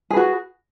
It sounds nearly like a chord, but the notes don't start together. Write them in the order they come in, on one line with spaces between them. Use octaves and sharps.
G#4 B4 F#4